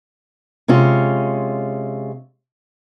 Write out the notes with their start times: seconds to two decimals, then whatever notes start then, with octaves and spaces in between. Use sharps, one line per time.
0.68 C3 G#3 C#4 F4